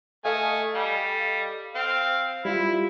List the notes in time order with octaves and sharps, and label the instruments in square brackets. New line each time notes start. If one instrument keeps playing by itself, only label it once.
[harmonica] A3 G#5 [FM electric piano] A4 D#5 F5
[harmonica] G3
C4 F5
[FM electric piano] G3 F4 [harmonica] E4